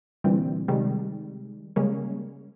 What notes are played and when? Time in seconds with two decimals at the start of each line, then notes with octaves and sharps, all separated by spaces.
0.24 A#2 D3 E3 G3 C4
0.68 C3 D#3 G3 G#3
1.76 C#3 G3 G#3 A#3 C#4